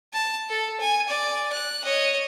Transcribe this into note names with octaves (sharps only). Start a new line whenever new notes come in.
A5
A4
G#5
D5
F#6
C#5 D#5